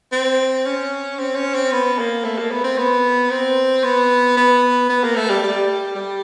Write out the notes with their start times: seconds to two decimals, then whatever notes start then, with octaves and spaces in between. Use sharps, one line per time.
0.12 C4
0.66 C#4
1.19 C4
1.36 C#4
1.54 C4
1.72 B3
1.99 A#3
2.24 A3
2.38 A#3
2.51 B3
2.64 C4
2.78 B3
3.30 C4
3.84 B3
4.37 B3
4.90 B3
5.04 A#3
5.16 A3
5.30 G3
5.43 G3
5.96 G3